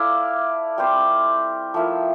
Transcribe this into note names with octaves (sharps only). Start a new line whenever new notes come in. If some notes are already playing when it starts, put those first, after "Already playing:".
Already playing: E4 A4 D5 F5
G3 C4 G4 C5
F3 A3 E4 A#4